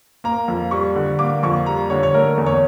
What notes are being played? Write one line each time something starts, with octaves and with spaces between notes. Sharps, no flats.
A#3 A#5
F2
G3 C#6
D3
A#3 D6
F2 C#6
G3 A#5
D3 C#5
C#5
A3 A#4
E2
C#5